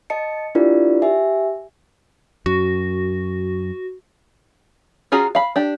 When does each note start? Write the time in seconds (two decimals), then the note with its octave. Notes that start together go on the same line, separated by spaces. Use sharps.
0.10 D#5 A5 C#7
0.55 D4 E4 F4 G4 A#4 D5
1.02 G4 E5 G#5
2.46 F#2 F#4
5.12 C#4 F4 F#4 G#4 A#5
5.35 F5 B5
5.56 D4 G4